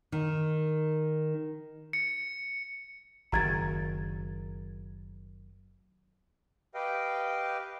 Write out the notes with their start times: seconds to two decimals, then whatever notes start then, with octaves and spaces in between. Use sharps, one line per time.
0.12 D#3
1.93 C#7
3.32 F#1 D#3 A#5 G#6 A6
6.74 G4 B4 D#5 F5 G5